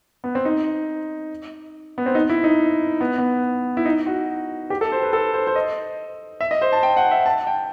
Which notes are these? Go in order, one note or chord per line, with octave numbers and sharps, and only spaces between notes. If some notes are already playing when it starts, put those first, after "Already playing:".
B3
C4
D#4
B3
C4
D#4
E4
D#4
B3
B3
E4
D#4
F#4
G4
A4
C5
B4
A4
C5
C5
D#5
E5
D#5
C5
A5
G5
F#5
E5
A5
G5